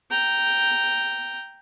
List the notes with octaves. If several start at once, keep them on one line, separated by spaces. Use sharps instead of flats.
G5 A#5